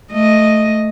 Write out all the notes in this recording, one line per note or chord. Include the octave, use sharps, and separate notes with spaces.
A3 D#5